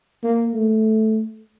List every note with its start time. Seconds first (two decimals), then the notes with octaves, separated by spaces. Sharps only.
0.24 A#3
0.54 A3